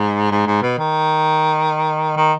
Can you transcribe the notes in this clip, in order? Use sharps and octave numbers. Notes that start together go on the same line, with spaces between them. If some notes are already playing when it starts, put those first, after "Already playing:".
Already playing: G#2
G#2
G#2
B2
D#3
D#3